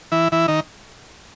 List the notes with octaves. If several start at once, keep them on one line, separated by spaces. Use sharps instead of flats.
E3 E4
E3 E4
D#3 D#4